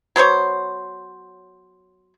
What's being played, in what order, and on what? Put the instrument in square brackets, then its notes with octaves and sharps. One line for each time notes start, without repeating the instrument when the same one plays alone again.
[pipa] F#3 B3 C5 C#5